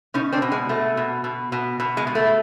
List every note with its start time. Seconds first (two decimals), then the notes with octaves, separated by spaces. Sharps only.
0.14 B2 C#4 D#4
0.33 C4 D4
0.42 B2
0.52 G#3
0.69 B2 A3
0.97 B2
1.24 B2
1.52 B2
1.80 B2
1.97 G#3
2.07 B2
2.15 A3